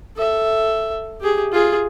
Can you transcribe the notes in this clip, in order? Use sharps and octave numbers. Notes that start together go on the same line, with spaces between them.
A4 E5
G4 G#4
F4 G#4